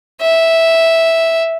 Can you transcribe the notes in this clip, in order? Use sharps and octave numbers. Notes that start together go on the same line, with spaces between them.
E5